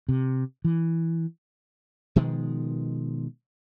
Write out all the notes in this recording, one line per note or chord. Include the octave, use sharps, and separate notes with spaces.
C3
E3
B2 D#3 F3 G#3